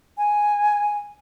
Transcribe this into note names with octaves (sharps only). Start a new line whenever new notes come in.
G#5